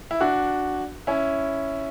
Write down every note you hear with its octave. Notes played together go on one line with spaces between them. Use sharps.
E4
D4 F#4
C#4 E4